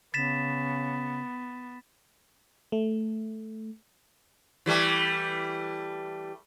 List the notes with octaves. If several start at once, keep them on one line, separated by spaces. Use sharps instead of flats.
C#3 B3 A6 B6 E7
A3
E3 G3 A3